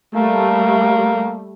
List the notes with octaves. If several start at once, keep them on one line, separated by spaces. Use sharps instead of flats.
G3 A3 A#3